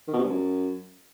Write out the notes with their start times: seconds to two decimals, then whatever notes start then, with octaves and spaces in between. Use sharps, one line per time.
0.08 D#3
0.13 B2
0.18 C3
0.24 G2
0.29 F#2